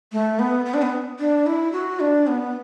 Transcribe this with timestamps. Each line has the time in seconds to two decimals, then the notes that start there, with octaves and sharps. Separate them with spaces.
0.12 A3
0.39 B3
0.65 B3
0.74 D4
0.82 B3
1.19 D4
1.46 E4
1.73 F#4
2.00 D4
2.27 B3